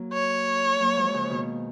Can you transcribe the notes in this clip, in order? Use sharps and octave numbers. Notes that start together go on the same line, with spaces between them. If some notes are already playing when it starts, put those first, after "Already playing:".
Already playing: F#3 A#3
C#5
F#3 A#3
F3 G#3
C#3 F3
B2 D#3